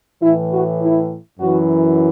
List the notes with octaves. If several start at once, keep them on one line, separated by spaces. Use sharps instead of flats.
A2 E3 E4
F#4
E4
F#2 E3 F#4